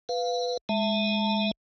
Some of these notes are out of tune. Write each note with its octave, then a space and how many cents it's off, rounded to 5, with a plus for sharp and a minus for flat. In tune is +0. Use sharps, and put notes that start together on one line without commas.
B4 +0 F5 +0
G#3 +0 E5 +0 A5 +25